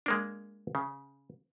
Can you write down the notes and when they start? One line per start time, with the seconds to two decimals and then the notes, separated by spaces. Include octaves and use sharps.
0.06 G#3 A#3 D4
0.75 C#3